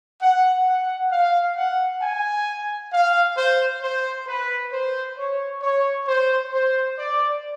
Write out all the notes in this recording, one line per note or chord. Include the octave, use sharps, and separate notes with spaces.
F#5
F#5
F5
F#5
G#5
F5
C5
C5
B4
C5
C#5
C#5
C5
C5
D5